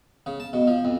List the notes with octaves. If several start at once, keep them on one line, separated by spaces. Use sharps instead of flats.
C#3
A5
B2
F3
F2